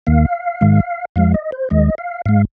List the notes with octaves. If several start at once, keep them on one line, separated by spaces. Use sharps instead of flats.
D#2 D#3 A#3 F5
G#2 D#3 G#3
F2 F3 G#3 F5
D#5
C5
D#2 D#3 G#3 D#5
F5
G#2 G#3 F5